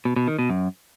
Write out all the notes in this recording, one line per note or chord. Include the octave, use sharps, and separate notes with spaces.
B2
B2
D#3
B2
F#2